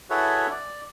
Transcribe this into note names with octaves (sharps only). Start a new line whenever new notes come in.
E4 F#4 G#4 A4 B4 C#5
D5